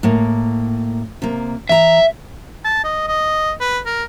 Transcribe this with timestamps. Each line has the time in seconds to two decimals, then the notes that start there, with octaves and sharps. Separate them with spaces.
0.03 A2 A#3
1.22 C3 A#3
1.69 E3 E5 A#5
2.65 A5
2.84 D#5
3.08 D#5
3.61 B4
3.86 A#4